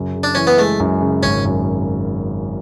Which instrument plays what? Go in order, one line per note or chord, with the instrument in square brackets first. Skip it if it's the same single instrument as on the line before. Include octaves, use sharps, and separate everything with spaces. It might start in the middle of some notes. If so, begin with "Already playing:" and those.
Already playing: [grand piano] F#2 C#3
C#3
[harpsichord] D4
[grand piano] E3 [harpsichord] C#4
[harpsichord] B3
[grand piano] G#3 [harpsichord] A3
[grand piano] F#2
C#3
[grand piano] G#1 [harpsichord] C#4
[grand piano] F#2